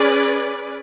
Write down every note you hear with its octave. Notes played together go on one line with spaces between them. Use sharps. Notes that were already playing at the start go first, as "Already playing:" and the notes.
Already playing: C#4 G#4 B4 D5